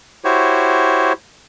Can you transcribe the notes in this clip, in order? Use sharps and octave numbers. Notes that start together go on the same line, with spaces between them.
E4 F#4 G4 C5 C#5